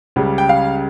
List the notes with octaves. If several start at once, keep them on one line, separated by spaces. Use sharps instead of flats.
C#2 C#3 G3
G5
F5